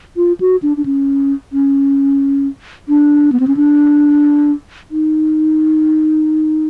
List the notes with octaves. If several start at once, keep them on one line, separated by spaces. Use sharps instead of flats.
F4
F#4
D4
D4
C#4
C#4
D4
B3
C4
C#4
D4
D#4